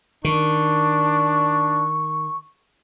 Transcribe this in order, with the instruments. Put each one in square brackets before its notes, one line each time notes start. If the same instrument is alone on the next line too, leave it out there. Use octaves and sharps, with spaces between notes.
[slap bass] D#3 [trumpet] D4 [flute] C#6